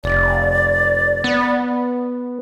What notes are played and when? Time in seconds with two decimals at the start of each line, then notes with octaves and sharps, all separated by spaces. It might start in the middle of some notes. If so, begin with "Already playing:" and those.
0.04 F1 D5
1.24 B3